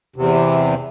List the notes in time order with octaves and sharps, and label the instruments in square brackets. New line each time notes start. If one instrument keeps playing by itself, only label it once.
[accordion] E2 C3